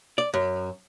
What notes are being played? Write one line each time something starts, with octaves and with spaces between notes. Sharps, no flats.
D5
F#2